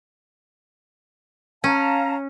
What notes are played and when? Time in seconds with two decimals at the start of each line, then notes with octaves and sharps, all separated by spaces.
1.64 C#4 F5 A5 A#5